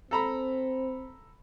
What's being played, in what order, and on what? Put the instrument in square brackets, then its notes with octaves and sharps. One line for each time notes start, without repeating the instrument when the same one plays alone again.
[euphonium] C4 [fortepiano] A4 A#5 B5